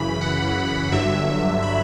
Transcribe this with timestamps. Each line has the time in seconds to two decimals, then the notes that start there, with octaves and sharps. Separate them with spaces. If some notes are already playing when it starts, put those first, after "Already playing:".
Already playing: F#2 C#3 E3 B5
0.21 F#5
0.92 G1 G2 D3 F#3 E5
1.62 B5